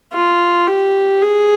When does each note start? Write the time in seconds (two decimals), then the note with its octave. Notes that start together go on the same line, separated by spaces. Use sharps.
0.13 F4
0.68 G4
1.22 G#4